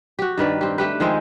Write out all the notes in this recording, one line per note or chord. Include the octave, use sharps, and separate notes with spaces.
F#4 G4
G2 D#3 B4 D5
C4 G4
A3 G4 B4
D#3 F3 G#3 C4